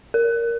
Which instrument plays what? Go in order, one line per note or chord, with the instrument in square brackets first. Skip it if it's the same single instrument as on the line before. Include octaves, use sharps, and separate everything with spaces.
[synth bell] A#4